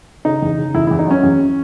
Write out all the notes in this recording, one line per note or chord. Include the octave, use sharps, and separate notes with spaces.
C#3 D#4
E2
C#3
E2 E4
E2 E4
D#4
F#3 C#4
E2